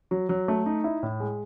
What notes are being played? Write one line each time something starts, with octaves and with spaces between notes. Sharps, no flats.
F#3
F#3
A3
D#4
E4
A2
G#3